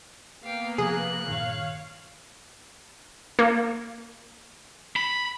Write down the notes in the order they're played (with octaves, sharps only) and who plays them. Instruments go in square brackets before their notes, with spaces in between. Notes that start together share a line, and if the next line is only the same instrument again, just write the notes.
[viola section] A#3 B3 [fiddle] F5 G5
[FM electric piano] C3 F3 B4 [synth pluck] G#4 [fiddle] F#6
[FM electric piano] G2 A#2 D#3 [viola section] C#5 F5
[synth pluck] A#3
[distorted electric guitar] B5